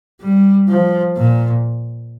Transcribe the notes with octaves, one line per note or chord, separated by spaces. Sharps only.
G3
F3
A#2